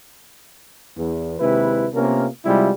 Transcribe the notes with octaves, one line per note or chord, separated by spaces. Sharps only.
E2
D#2 C3 G#3 E4 B4
C3 A#3 B3 C#4 F4 A#4
C3 G3 G#3 E4 F4